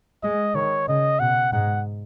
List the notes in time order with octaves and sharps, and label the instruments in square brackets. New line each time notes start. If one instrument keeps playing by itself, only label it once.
[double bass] G#3 [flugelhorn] D#5
[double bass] D#3 [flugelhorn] C#5
[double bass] C#3 [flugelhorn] D#5
[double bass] B2 [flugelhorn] F#5
[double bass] G#2 [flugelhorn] F#5